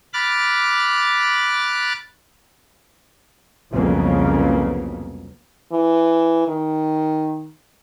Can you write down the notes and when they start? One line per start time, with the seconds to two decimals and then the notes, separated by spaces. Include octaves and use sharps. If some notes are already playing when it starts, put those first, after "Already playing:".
0.13 B5 D6 F6 F#6 A6
3.73 C2 F2 C#3 F#3 A#3 B3
5.72 E3
6.48 D#3